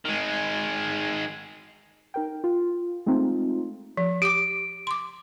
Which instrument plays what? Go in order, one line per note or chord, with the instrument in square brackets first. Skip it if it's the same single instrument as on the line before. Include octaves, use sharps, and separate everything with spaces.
[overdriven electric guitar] D#3 G#3
[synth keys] D#4 A#4 G5
F4
G#3 A3 C4 D#4 F4
[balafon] F3
[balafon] G4 D6 [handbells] D7
[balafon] C6 D6